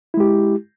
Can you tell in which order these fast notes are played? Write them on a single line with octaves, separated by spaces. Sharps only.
E4 G#3 G4